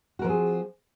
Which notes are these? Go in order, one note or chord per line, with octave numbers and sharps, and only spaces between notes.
F3 C4 F#4 G#4 A#4